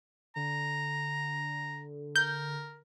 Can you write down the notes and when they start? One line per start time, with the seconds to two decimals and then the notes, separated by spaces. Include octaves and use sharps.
0.36 D3 A#5
2.16 A#4 G6